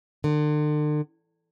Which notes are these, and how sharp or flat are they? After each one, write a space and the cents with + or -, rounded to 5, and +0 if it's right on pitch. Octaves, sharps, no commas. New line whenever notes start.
D3 +40